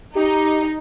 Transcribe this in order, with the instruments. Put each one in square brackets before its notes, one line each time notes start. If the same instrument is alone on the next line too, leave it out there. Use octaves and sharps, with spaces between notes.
[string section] D#4 [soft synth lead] G4